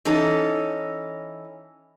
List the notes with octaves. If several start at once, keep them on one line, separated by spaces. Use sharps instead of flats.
E3 C#4 D#4 A4